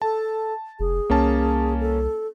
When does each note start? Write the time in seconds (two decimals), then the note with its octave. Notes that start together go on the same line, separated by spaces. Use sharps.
0.02 A4 A5
0.80 F1 G#4
1.10 C2 A#3 C#4 A5
1.80 A4